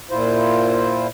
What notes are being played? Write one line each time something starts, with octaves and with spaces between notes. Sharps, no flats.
A#2 E4 F4 C5